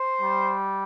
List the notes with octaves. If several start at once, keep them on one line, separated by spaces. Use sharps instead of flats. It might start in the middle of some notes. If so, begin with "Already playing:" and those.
Already playing: C5
G3